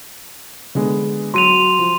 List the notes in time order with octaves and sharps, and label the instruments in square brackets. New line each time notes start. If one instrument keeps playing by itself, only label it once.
[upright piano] D3 G#3 B3
[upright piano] F#3 [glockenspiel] C6 D#7 F7
[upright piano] F3